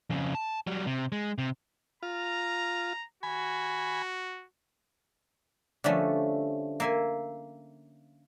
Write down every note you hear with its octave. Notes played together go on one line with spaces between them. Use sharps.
F2 C#3
A5
F#3 G3
C3
G#3
C3
F4 A#5
F#4 G#5 B5
D3 F3 G3 A3 C#4
A#3 E5 G#5